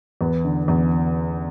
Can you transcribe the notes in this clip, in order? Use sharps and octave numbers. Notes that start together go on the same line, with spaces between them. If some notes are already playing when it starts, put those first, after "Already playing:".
E2 B4
D3
E2